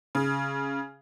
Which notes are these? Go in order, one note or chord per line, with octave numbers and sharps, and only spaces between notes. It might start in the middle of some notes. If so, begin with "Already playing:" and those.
C#3